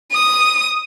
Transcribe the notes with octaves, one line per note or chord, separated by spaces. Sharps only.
D#6